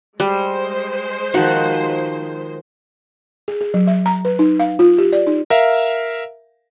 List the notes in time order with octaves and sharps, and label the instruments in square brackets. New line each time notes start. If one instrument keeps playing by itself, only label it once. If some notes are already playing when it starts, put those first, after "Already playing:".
[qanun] G3 [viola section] G#3 C5
[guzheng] D#3 F3 [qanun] F#4
[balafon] G#4
G#4
F#3
E5
A#5
B4
D#4
F5
F4
G4
D5
D#4
[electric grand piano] A#4 E5 F5